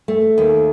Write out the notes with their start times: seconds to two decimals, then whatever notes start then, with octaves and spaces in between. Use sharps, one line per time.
0.08 A3
0.38 D#2